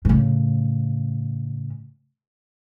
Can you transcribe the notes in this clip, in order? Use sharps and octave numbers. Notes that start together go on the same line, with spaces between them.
A2 C#3